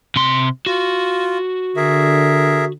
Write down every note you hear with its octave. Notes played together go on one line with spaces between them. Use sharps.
C3 C6
F4 F#4
D3 G#4 A#4 E5